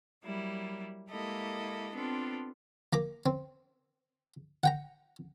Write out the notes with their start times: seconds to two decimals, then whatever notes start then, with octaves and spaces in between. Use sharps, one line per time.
0.24 F#3 G3 A#3 E4
1.10 G#3 A#3 E4 G4 A4 D#5
1.95 B3 C4 D4 F4 A4
2.93 A#3 A#5 D6
3.26 C4
4.64 F#5 G5 A#5